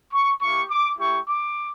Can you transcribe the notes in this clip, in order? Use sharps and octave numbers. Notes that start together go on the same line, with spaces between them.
C#6
A#3 E4 G4 C#6
D6
A3 E4 G4 C#6
D6